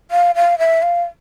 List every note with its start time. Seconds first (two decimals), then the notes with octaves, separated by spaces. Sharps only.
0.11 F5
0.36 F5
0.59 E5
0.82 F5